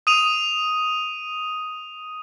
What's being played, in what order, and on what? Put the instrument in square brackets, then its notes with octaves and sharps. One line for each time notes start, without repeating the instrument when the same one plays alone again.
[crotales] D#6 D#7 F7